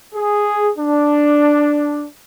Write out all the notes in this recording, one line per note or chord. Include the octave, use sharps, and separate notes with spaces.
G#4
D4